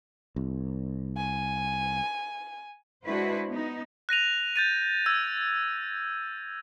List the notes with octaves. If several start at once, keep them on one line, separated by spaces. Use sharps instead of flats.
C2
G#5
G#3 D4 E4 F#4 B4 C5
B3 D#4
F#6 A#6 D#7 F7
G6 A6 D#7
E6 G#6